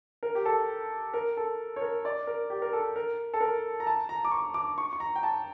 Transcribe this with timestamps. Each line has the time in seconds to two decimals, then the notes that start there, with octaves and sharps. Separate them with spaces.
0.23 A#4
0.35 G4
0.46 A4
1.14 A#4
1.37 A4
1.76 C#5
1.82 A#4
2.05 D5
2.27 A#4
2.50 G4
2.62 A#4
2.73 A4
2.96 A#4
3.34 A4
3.41 A#4
3.80 A#5
3.87 A5
4.09 A#5
4.25 D6
4.31 C#6
4.54 D6
4.78 C#6
4.93 C#6
5.00 A#5
5.16 G5
5.23 A5